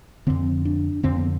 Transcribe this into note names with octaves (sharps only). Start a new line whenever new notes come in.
F2 D3 C4
D4
F2 D3 C4
B3